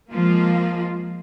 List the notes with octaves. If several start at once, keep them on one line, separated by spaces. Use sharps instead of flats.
F3 G#3 A#3 F4